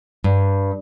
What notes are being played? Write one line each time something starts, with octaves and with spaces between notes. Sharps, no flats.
G2